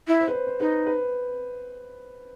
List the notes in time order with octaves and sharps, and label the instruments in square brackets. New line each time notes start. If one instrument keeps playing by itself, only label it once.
[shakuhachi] E4
[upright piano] C5
B4
C5
C5
[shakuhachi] D#4 [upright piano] B4
[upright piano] B4